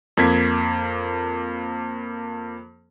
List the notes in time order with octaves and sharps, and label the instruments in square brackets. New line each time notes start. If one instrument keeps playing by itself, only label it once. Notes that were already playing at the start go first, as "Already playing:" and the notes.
[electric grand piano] F2 A#3 G#6 B6